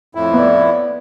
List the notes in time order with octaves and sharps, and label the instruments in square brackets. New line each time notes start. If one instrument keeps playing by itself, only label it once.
[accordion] F2 A2 E4
[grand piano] B3 D5